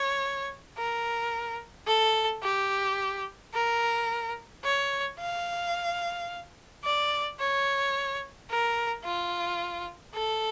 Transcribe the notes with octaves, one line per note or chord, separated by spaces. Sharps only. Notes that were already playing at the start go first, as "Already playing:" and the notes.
Already playing: C#5
A#4
A4
G4
A#4
C#5
F5
D5
C#5
A#4
F4
A4